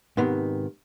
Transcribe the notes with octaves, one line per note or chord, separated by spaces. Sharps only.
G#2 C3 D#3 B3